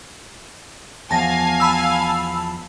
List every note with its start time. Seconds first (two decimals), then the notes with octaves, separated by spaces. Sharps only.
1.11 E2 F3 F5 G#5 A5 A#6
1.60 A5 B5 E6